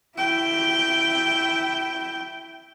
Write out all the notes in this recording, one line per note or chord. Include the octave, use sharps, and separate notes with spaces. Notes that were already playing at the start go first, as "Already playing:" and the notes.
E4 G5